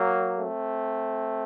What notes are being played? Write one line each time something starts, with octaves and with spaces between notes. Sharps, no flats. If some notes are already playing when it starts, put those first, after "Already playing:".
Already playing: F#3 A#3
A3 C4